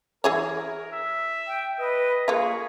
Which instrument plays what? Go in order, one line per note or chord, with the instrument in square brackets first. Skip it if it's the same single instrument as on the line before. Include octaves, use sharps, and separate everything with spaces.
[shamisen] E3 G#4 C#5 [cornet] A#4
[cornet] E5
[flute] G5
[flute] B4 [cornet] D#5
[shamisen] A#3 F4 [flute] G#4 [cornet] C#5